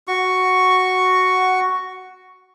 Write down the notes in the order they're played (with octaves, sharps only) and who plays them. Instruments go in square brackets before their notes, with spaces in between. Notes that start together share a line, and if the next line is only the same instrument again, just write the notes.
[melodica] F#4 C#6